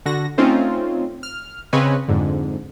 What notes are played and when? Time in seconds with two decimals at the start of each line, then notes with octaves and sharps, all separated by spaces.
0.05 D3 F#4 A#6
0.38 A3 C4 C#4 D#4 F4
1.23 F6
1.73 C#3 C4 B4 C#5 D#5 G#5
2.08 F2 G#2 D3